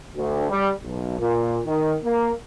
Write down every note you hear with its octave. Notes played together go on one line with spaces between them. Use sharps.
D2
G3
B1
A#2
D#3
A#3